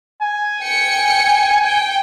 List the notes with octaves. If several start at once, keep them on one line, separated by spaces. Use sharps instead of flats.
G#5
G5 C#7
G5